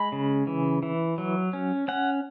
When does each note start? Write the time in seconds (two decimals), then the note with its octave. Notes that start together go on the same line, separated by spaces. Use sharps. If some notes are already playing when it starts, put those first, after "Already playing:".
Already playing: G#3 B5
0.12 C#3
0.47 E3
0.83 E3
1.18 F#3
1.53 C#4
1.88 C#4 F#5